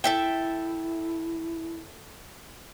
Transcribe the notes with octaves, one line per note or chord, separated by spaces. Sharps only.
E4 A4 E5 G5